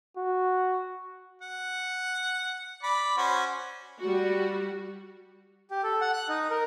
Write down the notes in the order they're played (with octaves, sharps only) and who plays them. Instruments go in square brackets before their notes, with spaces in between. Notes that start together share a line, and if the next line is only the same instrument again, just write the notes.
[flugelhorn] F#4
[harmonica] F#5
D5 B5
C#4 F#4 C5
[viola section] G3 F#4
[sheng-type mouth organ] G4
A4
F#5
F#6
D#4
A#4